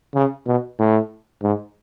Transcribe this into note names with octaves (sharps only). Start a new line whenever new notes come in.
C#3
B2
A2
G#2